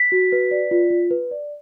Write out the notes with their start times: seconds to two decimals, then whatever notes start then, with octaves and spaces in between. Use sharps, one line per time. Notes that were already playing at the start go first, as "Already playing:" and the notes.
Already playing: B6
0.12 F#4
0.32 B4
0.51 D5
0.71 F4
0.90 F4
1.11 B4
1.31 D5